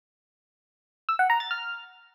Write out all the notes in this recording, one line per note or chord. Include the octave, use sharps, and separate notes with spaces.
E6
F#5
A#5
A6
F6